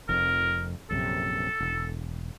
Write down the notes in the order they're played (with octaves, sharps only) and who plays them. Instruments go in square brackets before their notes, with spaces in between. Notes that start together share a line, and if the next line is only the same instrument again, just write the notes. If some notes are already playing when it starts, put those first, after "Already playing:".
[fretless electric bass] F1 F2 [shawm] A#4
[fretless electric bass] A#1 F#2 C3 [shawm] A4
[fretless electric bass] E1